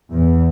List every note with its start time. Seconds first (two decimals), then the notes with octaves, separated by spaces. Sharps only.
0.12 E2